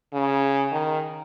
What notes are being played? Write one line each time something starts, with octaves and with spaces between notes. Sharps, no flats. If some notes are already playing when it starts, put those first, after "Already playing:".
C#3
D#3